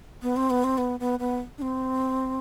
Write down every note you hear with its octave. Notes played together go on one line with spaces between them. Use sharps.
B3
C4
B3
C4
B3
B3
B3
D4
C4